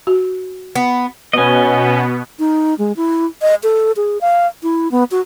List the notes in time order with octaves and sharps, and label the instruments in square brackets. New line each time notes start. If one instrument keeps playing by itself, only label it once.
[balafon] F#4
[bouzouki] B3
[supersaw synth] B2 B3 [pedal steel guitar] C#4 D#5
[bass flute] D#4
G#3
E4
D#5
A4
G#4
F5
E4
B3
F#4